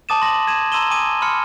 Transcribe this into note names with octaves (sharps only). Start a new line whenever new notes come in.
A5 D6 D#6 A6 D#7 E7
C6 A#6 F#7
G#6 D#7 E7
A#5 C6 E6 D#7 E7 G7
G#5 D6 D#6 D#7
B5 C6 F6 C#7